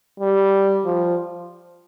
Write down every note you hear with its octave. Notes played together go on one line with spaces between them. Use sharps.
G3
F3